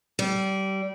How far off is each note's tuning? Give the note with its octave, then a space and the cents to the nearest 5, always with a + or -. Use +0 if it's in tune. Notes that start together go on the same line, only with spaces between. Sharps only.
G3 -25